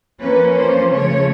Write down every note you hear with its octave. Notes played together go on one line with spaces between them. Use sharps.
F3 A#3 C#4 B4
C5
C#3 F3 A3 C#5